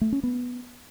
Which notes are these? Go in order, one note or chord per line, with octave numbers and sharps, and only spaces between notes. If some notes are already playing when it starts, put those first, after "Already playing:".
A3
C#4
B3